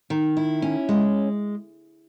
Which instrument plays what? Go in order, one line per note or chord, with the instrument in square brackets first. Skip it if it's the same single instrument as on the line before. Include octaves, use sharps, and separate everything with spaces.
[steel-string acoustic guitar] D#3
E4
C#4
G#3